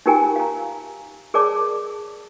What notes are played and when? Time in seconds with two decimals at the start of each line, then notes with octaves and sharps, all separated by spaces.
0.06 D#4 F4 G4 A#4 G5 G#5
0.36 F5 A#5
1.34 G#4 A#4 C#5 D5 A5 D6